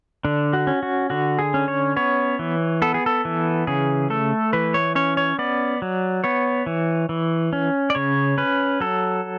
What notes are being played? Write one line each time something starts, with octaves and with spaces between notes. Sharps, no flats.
D3 D4
F#4
C#4
F#4
D3 F#4
G#4
C#4
C#5
B3 C#5
E3
B3 A4
G#4
A4
E3
C#3 G#4
A3 A4
E3 B4
C#5
C#4 C#5
C#5
B3 D5
F#3
B3 C#5
E3
E3
C#4
D5
C#3 C#5
C#4 B4
F#3 A4